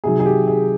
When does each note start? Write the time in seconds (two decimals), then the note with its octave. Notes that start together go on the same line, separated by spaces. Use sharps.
0.04 C3 D#3 F#3 G#4
0.20 G#4
0.26 G4
0.48 G#4